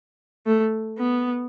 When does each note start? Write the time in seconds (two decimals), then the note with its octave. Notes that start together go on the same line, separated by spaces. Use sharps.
0.46 A3
0.98 B3